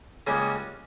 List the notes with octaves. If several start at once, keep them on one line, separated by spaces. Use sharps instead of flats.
C#2 C#3 G3 A#3 C#4